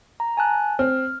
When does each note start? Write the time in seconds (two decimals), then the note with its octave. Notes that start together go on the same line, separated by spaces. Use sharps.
0.20 A#5
0.37 G#5 A5 F#6
0.79 C4 F6